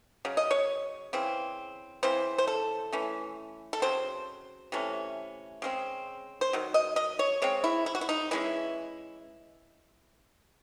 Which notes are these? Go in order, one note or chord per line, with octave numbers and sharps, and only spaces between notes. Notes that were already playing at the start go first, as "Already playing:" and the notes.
C#3 F#3
D#5
C#5
C#3 E3 C4
C#3 E3 C4 C5
C5
A4
E3 A3 C#4
A4
C#3 F#3 C4 C5
C3 E3 A3 C#4
C#3 G#3 C4
C5
D#3 F#3
D#5
D#5
C#5
C#3 G#3 C4 C#5
E4
E4
F#4
E4
D#4
E3 G#3 C#4 E4